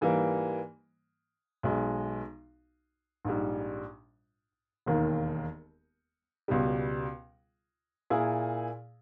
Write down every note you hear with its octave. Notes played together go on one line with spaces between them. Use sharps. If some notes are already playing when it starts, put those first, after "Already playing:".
G#2 E3 G3 A#3
B1 B2 G#3
A#1 G#2 G3
E1 D#2 D#3 A#3
C#2 B2 G3
A#2 A#3 E4 G#4